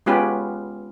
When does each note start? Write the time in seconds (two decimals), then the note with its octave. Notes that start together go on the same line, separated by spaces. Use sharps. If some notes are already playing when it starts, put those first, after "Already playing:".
0.06 G#3 B3 C#4 F4 G4 B4